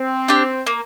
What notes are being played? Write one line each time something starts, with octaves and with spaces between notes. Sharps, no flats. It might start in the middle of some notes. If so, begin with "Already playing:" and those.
Already playing: C4
D4 G4
A#3